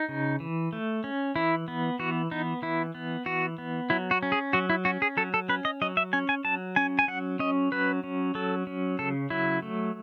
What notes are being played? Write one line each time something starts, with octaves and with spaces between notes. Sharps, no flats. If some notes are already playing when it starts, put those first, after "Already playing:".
Already playing: D#4
C#3
E3
A3
C#4
E3 E4
B3
E3 F#4
B3 D#4
E3 E4
B3
E3 F#4
B3
F#3 E4
F#4
C#4
G#4
F#3 F#4
E4
C#4 F#4
G#4
F#3 A4
A4
C#4 B4
D#5
F#3 D#5
E5
C#4 G#5
G#5
F#3 A5
C#4 G#5
G#5
F#3 F#5
C#4 D#5
F#3 B4
C#4
F#3 A4
C#4
C#3 A4
F#3 E4
A3